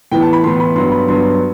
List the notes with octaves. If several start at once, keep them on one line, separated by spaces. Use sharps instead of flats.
A2 E3 B3 G5
A5
B5
A2 E3 B3 C6
B5
G2 F#3 B3 C6
B5
G2 F#3 B3 C6